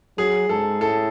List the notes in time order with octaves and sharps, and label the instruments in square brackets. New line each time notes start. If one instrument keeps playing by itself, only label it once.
[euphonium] F#3 [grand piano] G#4
[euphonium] G#2 [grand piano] A4
[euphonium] A2 [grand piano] A4